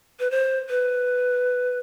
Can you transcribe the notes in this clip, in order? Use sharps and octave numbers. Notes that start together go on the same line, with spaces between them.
B4
C5
B4